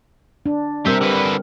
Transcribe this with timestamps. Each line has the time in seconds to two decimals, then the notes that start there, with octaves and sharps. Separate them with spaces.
0.46 D4
0.86 G3 C4 G4 A#4 E5
1.01 D3 B4